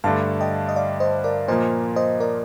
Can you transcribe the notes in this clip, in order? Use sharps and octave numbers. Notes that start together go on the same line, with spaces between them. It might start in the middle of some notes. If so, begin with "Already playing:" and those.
G2 D3 A3 D4 F5 A5
D#5 G5
D#5
D5 F5
C5 D#5
A#4 D5
A#2 F3 A#3 C5 D#5
C5 D#5
A#4 D5